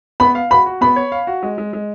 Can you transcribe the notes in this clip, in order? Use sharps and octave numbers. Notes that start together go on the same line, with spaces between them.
B3 B5
F5
F#4 B5
F#4
B3 B5
C#5
F5
F#4
G#3
G#3
G#3